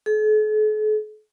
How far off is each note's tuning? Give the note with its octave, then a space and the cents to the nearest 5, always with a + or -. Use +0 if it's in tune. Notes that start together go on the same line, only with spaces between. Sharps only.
A4 -45